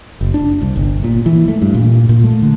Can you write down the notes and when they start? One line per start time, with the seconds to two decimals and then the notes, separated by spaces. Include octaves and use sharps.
0.21 F#1
0.34 D4
0.61 C2
0.76 G1
1.04 A#2
1.26 E3
1.48 A3
1.62 G2
1.75 A#2
2.09 A#2
2.24 A3
2.42 D3